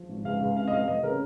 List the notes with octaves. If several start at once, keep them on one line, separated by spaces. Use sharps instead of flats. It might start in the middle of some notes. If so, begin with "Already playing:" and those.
Already playing: F3
G#1
C#2 F5
C#2 F5
C3 F5
D#5
F1 F5
F1 D#5
C#3 A#4